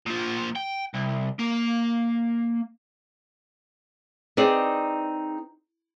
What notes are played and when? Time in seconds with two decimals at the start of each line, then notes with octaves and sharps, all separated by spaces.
0.06 A#2 F3
0.56 G5
0.94 C2
1.39 A#3
4.37 C4 D#4 G#4 B4 D5